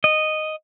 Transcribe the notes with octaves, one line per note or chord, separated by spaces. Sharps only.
D#5